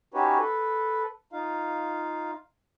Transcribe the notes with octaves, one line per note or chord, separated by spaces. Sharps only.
C#4 D#4 F#4 G4 B4 C#5
A4 B4
D#4 F4 F5